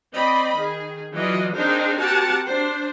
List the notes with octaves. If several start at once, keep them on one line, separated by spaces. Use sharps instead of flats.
C4 D5 D#5 B5
D#3 G#4
E3 F#3 F4 D5 D#5
C4 D4 D#4 G#4 A#4 C5
C4 F#4 G4 A#4 F#5 A5
D4 C5